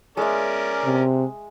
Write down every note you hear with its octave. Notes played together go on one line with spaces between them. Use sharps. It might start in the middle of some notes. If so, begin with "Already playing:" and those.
G#3 C#4 A#4 D5 E5
C3